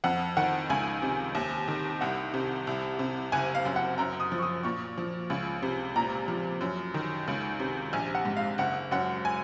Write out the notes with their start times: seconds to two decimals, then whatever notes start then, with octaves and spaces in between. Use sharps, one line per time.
0.04 F2 F#5
0.37 D#3 F#5
0.70 C#2 G#5
1.02 C3
1.35 D#2
1.68 D#3
2.01 C2 F#5
2.34 C3
2.67 C2
2.99 C3
3.32 F#1 G#5
3.55 F5
3.65 F#2
3.76 F#5
3.98 F#2 A#5
4.20 D#6
4.32 F3
4.38 C#6
4.43 D#6
4.63 A#2 C#6
4.98 F3
5.30 C#2
5.63 C3
5.96 A#2 A#5
6.28 F3
6.61 F#2
6.94 D#3
7.28 C#2
7.59 C3
7.93 A#1 G#5
8.15 F#5
8.25 G#2
8.37 F5
8.58 F#1 F#5
8.91 F#2 F#5
9.25 G#5